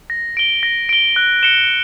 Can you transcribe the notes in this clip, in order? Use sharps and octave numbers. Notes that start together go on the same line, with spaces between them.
A#6
D7 G7
A#6
D7 G7
F#6
C#7 E7 G7